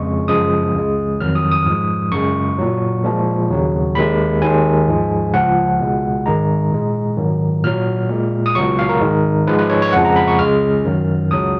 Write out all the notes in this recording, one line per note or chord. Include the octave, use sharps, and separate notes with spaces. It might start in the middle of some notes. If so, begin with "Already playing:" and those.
Already playing: F2 C#3 G#3 C#6
F#2 C#3 F3 G#3 D#6
C#2 C#3 G#3
F2 D#3 F#3 F6
D#6
D#6
G#2 F3 G#3
F#2 C#3 G#3 C#6
A#2 F#3
A#2 F3 G#3
D#2 C#3 F#3
D#2 D#3 G#3 B5
D#2 D#3 G#3 G#5
G#2 F3 G#3
C#2 C#3 F3 F#5
C#2 B2 G#3
G#2 D#3 G#3 A#5
A#2 G#3
G#2 D#3 F#3
A#2 F#3 F6
A#2 G#3
D#6
C#2 B2 F#3 C#6
F5
A#4
G#2 D#3 G#3
G#2 F3 G#3 B4
B4
C#5
C#5
F2 C#3 F3 G#3 F#5
A#5
B5
C#6
C#2 C#3 G#3 F6
F#2 D#3 F#3
C#2 C#3 F#3 D#6